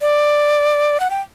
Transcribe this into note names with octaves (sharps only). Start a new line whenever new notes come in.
D5
F#5
G5